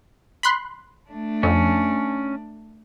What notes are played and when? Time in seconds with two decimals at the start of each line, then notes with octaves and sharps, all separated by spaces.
0.43 B5 C6 F#6
1.10 A3 D4
1.43 F2 C#4